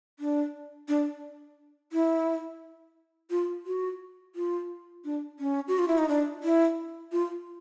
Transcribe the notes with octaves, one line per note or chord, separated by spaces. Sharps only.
D4
D4
E4
F4
F#4
F4
D4
C#4
F#4
F4
E4
D#4
D4
E4
F4